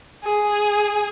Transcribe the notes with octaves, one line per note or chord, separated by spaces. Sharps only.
G#4